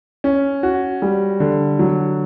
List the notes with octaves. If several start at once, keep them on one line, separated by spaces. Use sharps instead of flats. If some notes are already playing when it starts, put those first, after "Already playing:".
C#4
F#4
G3
D3
F#3